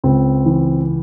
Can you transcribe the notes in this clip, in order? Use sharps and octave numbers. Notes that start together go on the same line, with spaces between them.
C#2 C4
E3